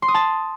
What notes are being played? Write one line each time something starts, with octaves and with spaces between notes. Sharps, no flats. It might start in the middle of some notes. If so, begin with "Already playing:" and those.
C6
D#6
A5